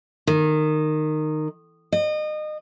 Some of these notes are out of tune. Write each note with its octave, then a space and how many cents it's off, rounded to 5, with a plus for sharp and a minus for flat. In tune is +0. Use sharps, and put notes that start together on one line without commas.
D#3 -15
D#5 -30